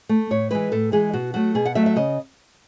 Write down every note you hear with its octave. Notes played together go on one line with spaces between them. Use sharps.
A3
A2 C#5
E3 G#3 B4
A2 A4
E3 G#3 G#4
B2 F#4
F#3 A3 F#4
B2 G#4
F#5
F#3 A3 E5
E5
C#3 D#5